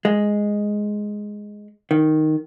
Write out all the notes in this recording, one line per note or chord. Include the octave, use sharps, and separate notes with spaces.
G#3
D#3